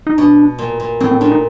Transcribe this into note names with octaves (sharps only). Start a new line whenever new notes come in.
D#4
B2 D4
A#2
A#2
A2 C4
C4
A#2 D4
D#4